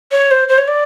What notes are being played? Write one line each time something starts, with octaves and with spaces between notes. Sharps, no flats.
C#5
C5
C5
C#5
D5